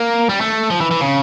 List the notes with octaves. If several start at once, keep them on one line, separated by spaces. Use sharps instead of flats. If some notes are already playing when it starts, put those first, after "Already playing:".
Already playing: A#3
G3
A3
F3
E3
E3
C#3